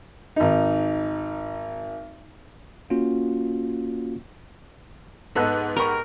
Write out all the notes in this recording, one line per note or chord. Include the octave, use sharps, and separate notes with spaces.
G#1 D#4
A#3 C#4 F4 F#4
G#2 B3 A4 B4 D#5 F#6
D#4 G4 A#4 A#5 B5 C#6